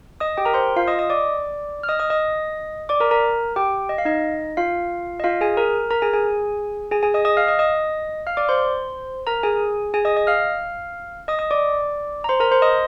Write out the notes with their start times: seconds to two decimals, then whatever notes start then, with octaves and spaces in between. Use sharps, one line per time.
0.20 D#5 D#6
0.37 G4 G5
0.45 A#4 A#5
0.54 C5 C6
0.76 F4 F5
0.87 D#5 D#6
0.99 D#5 D#6
1.10 D5 D6
1.83 F6
1.89 D#5 D#6
1.99 D#5 D#6
2.10 D#5 D#6
2.89 D5 D6
3.00 A#4 A#5
3.11 A#4 A#5
3.56 G4 G5
3.89 D#5
3.98 F5
4.05 D#4 D#5
4.57 F4 F5
5.20 D#5
5.24 F4 F5
5.41 G#4 G#5
5.57 A#4 A#5
5.91 A#4 A#5
6.02 G#4 G#5
6.13 G#4 G#5
6.91 G#4 G#5
7.03 G#4 G#5
7.14 D#5 D#6
7.25 D#5 D#6
7.37 F5 F6
7.47 D#5 D#6
7.59 D#5 D#6
8.27 F5 F6
8.37 D5 D6
8.49 C5 C6
9.27 A#4 A#5
9.43 G#4 G#5
9.94 G#4 G#5
10.05 D#5 D#6
10.17 D#5 D#6
10.27 F5 F6
11.28 D#5 D#6
11.39 D#5 D#6
11.51 D5 D6
12.24 A#5
12.29 C5 C6
12.40 A#4 A#5
12.52 C5 C6
12.62 D#5 D#6